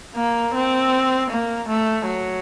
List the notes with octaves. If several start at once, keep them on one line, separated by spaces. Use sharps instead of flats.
A#3
C4
A#3
A3
F#3